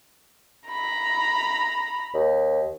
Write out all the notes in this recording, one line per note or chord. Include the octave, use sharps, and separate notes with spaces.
A#5 B5
D#2